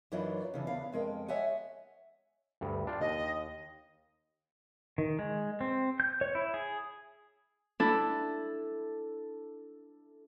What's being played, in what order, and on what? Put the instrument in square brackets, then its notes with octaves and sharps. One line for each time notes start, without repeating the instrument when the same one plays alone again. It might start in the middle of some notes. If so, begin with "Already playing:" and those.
[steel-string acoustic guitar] F#2 E3 F#3 D4 D#4 F4
C#3 E3 D4
E2 D4 F5
F2 G#3 A#4 G5
C#5 D#5 E5 F#5 G#5
[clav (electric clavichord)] D2 G2
D4 F4 G5
[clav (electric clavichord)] D#2 [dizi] D#5
[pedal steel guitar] D#3
G#3
C4
G6
C#5
E4
G#4
[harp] D4 E4 A4